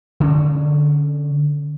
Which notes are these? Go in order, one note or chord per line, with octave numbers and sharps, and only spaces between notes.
D3 C#4